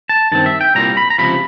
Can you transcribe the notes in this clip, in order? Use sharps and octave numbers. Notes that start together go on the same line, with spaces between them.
A5
G2 D#3 C4 A5
E5
G5
C2 A#2 G3 C4 A#5
B5
A#5
C#2 C3 F3 B5